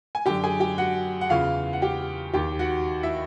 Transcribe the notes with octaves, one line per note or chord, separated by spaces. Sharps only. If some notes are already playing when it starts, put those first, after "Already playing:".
G#5
F#2 D3 G4 G5
G#4 G#5
G4 G5
F#4 F#5
F#5
E2 C#3 E3 F4 F5
F#5
G4 G5
D#2 D#3 G4 G5
F#4 F#5
E4 E5